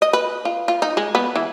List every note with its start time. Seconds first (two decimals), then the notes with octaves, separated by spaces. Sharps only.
0.02 D#5
0.13 B4
0.45 F4
0.68 F4
0.82 D#4
0.97 G#3
1.15 B3
1.36 E3